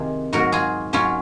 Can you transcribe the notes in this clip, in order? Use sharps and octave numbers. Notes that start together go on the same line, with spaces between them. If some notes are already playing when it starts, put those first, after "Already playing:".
Already playing: C3 D#3 A#3 F4 G#4
G#2 F#3 A#3 F#4 A#4
F4 G#4
G#2 F#3 A#3 C#4 F4